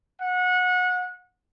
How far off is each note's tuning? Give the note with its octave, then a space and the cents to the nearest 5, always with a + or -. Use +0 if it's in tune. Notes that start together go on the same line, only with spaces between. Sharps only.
F#5 -25